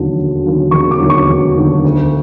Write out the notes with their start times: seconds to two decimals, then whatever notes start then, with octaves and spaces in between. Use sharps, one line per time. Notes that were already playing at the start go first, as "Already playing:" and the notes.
Already playing: E1 D#2 D3 F#3
0.16 E1
0.44 D#2 D3 F#3
0.71 E1 C#6
0.91 D6
1.00 D#2 D3 F#3
1.10 C#6
1.27 E1
1.56 D#2 D3 F#3
1.85 D2